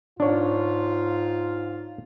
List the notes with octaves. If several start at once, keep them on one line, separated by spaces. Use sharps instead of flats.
G#2 D4 F4 C#5